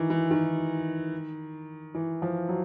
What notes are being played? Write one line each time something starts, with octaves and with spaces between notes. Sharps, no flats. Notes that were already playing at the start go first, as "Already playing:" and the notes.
Already playing: D#3 E3
E3
D#3
E3
F3
F#3